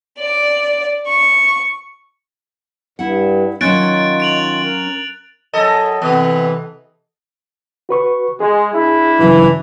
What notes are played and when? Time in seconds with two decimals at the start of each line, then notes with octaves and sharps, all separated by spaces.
0.20 D5
1.08 C#6
2.99 G2 E4 F#5
3.61 D#3 F#3 C#4 D#4 F4 F#6 A6 D7
4.20 D7 F7 F#7
4.62 A#4
5.53 F#2 A4 D#5
6.02 C3 E3 B3
7.89 F#4 B4 C#6
8.40 G#3 G#4
8.73 D4 E4
9.19 G2 C#3 E3 F#3